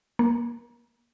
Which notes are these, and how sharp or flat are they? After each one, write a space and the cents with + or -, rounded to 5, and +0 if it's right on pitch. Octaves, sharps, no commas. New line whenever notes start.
A#3 +25